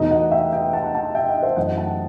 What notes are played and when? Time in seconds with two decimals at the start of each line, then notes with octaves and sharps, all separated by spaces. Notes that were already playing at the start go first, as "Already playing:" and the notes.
Already playing: E2 B2 A3 D#4 B4 D#5
0.11 D#5 F#5
0.31 E5 G5
0.53 E5 G5
0.73 F#5 A5
0.94 F#5 A5
1.15 E5 G5
1.29 D#5 F#5
1.42 C5 E5
1.56 F#2 E3 A3 D#5 F#5
1.77 F#5 A5